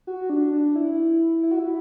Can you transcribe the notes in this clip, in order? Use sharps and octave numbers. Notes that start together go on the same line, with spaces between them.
F#4
D4
D4
E4
E4
F#4
E4